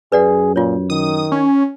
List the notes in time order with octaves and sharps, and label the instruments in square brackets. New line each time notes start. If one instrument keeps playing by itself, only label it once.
[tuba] F#2 [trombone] G#4 [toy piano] B4 D5 F#5
[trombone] A#2 [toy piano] F4 C#5
[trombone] D#3 [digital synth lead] D#6
[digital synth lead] C#4